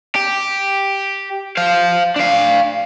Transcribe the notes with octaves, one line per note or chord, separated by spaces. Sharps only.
G4
C5 F5
D4 F5